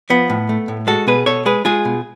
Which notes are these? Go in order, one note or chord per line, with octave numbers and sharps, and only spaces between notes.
F3 B3
A2
A3
A2
G#3 F#4 A4
B2 G#4 B4
B2 A4 C#5
G#3 G#4 B4
G#3 F4 G#4
B2